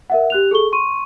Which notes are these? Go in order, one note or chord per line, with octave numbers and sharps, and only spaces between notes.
A#4 E5 F#5
G4 F#6 F7
G#4 A4 C#6 G7
C6 C#6 D#7